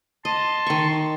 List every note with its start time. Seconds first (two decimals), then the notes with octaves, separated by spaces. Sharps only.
0.25 D#5 A5 C6
0.67 D#3 C#6